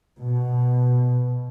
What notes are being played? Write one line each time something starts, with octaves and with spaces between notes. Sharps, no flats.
B2